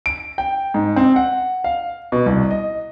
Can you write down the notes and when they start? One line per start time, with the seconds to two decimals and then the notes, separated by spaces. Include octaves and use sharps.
0.06 D7
0.38 G5
0.74 G#2
0.96 C4
1.16 F#5
1.64 F5
2.12 B2
2.26 C2
2.51 D#5